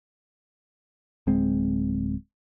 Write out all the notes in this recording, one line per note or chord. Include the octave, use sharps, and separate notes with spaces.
D1 G#3 C4